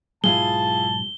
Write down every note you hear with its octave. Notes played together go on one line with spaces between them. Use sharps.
B1 G#2 G#3 E4 F4 G#4 A5 G7